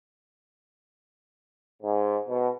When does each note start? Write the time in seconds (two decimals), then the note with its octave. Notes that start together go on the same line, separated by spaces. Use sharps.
1.82 G#2
2.27 B2